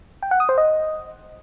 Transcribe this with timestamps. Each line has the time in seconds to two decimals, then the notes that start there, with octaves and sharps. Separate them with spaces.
0.23 G5
0.31 F#5
0.40 D#6
0.49 C5
0.58 D#5